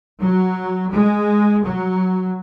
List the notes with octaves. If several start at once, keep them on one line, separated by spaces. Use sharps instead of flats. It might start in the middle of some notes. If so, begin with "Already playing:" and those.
F#3
G#3
F#3